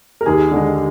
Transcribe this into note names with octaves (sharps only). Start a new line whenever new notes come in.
A#4
D#2 G#4
D3 G#3